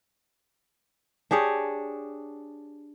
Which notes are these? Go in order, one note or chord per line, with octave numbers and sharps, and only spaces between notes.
D4 G4 G#4 C#5